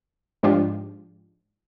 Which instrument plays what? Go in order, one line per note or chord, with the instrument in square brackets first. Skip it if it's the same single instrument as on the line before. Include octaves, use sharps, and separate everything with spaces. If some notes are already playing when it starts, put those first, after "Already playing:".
[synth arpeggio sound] G#2 F3 G#3 D4 F4 G4